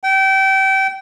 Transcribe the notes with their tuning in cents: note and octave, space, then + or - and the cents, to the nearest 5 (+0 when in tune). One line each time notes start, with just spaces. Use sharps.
G5 -25